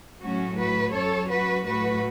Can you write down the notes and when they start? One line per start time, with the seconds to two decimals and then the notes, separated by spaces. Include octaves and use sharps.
0.22 A2 F#3 C#4 F#4
0.57 F#4 B4
0.93 F#2 F#3 A4 C#5
1.29 F#4 B4
1.65 A2 F#3 F#4 B4